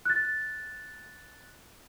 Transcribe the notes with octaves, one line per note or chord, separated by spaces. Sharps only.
F#6 A6